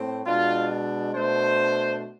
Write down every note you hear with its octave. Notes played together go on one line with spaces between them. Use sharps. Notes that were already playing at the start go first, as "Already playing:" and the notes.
Already playing: A2 C4
B2 G#3 D4 F4
B2 A3 D4 C5